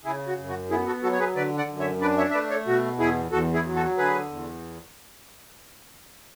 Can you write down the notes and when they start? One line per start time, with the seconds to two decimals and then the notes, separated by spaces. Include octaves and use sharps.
0.05 C#3 E4 G#4
0.27 F#4
0.38 F#2
0.49 F#4
0.70 B3 E4 G#4
0.87 F#4 A4
1.03 F#3 F#4 A4
1.12 C#5
1.20 G#4 B4
1.36 D3 B4 D5
1.58 D5 F#5
1.69 F#2
1.80 C#5 E5
2.01 D4 B4 D5
2.17 C#5 E5
2.30 E5
2.34 A3 B4 D5
2.50 A4 C#5
2.67 B2 F#4
2.99 E2 E4 G#4
3.32 E2 F#4 A4
3.54 E4 G#4
3.65 F#3
3.75 F#4 A4
3.98 D3 G#4 B4
4.30 E2